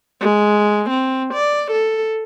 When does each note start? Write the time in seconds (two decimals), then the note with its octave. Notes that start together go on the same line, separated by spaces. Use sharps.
0.21 G#3
0.90 C4
1.34 D5
1.71 A4